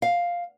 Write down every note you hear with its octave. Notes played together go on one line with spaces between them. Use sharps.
F5